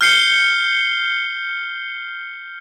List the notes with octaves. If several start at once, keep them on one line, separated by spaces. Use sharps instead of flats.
F6 G6 C7 C#7 G7